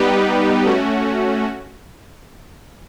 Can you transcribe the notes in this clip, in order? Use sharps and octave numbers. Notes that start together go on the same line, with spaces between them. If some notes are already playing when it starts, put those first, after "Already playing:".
Already playing: G3 B3 D#4 G4 B4
A3 C#4 F#4